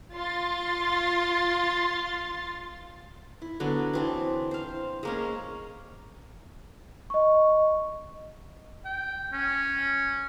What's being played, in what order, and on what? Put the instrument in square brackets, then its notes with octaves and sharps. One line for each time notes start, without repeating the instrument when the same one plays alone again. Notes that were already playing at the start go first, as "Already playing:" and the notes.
[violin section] F4 C6 A6
[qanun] E4
D3 F#3 B3
E3 C4 D4
C5 F5
G#3 A#3 C#4
[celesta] D#5 C#6
[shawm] G5
C#4